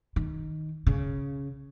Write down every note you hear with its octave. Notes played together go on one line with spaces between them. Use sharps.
D#3
C#3